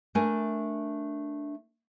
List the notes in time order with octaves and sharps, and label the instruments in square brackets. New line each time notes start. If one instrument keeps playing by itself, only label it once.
[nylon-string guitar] A3 D4 A#4 G#5